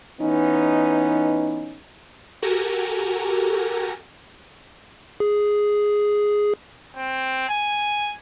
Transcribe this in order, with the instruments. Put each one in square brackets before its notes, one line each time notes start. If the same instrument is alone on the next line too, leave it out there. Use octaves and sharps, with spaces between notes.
[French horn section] E3 B3 C#4 D#4
[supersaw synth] F#4 G4 A4 A#4 G#5 A#5
[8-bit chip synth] G#4
[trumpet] C4
G#5